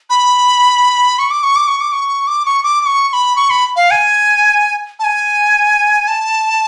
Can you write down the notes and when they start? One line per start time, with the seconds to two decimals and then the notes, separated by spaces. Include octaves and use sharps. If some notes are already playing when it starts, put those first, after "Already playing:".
0.10 B5
1.19 C#6
1.31 D6
1.43 C#6
1.56 D6
1.68 C#6
1.81 D6
1.93 C#6
2.27 D6
2.46 C#6
2.64 D6
2.81 D6
2.86 C#6
3.09 C#6
3.13 B5
3.36 C#6
3.50 B5
3.76 F5
3.91 G#5
4.99 A5
5.04 G#5
6.08 A5